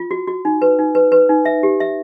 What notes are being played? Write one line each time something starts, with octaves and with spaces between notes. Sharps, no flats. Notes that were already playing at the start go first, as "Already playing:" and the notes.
Already playing: F4
F#4
F#4
D#4
B4
D#4
B4
B4
D#4
E5
G4
E5